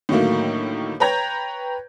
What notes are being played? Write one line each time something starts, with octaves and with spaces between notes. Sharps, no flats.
A2 D3 D#3 F#3 A3 A#3
B4 C#5 G5 A#5 G6 G#6